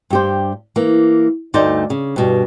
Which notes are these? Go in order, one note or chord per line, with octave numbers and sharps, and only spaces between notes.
G2 G4 C5
E3 A#3
D2 G2 A3 D#4 C5 D5
C#3
G2 B2 G3